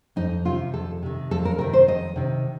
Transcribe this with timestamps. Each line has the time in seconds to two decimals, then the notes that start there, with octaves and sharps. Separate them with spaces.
0.16 F2 D#4
0.45 C3 D#3 F4
0.73 F2 A4
1.03 C3 D#3
1.31 F2 A4
1.45 A#4
1.59 C3 D#3 A#4
1.73 C5
1.88 F2 D#5
2.16 C3 D#3